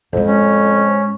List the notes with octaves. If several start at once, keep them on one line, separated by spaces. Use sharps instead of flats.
F2 A2 G#3
C#4